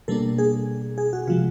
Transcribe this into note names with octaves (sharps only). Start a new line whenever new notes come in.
B2 G3 A#3 D4 A4
G#4
G#4
F#4
C3 F3 G#3 F4